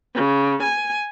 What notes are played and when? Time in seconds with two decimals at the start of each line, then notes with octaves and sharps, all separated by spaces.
0.15 C#3
0.63 G#5